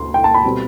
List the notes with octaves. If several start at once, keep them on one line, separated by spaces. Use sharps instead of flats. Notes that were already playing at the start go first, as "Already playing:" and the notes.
Already playing: D2 C6
G5
A5
B5
B2 G3 C4